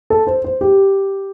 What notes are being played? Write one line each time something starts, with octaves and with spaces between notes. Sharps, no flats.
A4
C5
C5
G4